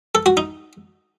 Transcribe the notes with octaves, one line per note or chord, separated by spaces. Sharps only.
A4
F#4
D#4